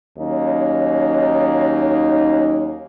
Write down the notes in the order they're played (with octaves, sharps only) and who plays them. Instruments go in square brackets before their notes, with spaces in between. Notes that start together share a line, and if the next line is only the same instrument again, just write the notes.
[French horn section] D#2 F#3 C#4 D#4